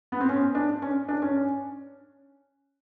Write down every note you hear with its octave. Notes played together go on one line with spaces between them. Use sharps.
B3
C4
C#4
D4
C#4
D4
C#4